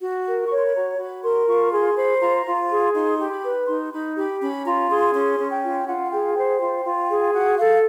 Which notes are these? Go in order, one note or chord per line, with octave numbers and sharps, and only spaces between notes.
F#4
A#4
C#5 C#6
C6
B5
F#4 A#5
F#4 B5
A#4 C6
F4 C#6
G#4 C6
C5 B5
F4 A#5
F4
G#4
D#4 C6
G4
B5
B4
D#4 C6
D#4 B5
G4 B5
C#4 B5
F4 A#5
G#4 C6
C#4 C6
C#4
G5
F4
F4 F#5
G#4 G5
C5 G5
F4 G5
F4
G#4
F#4 F#5
A4 F5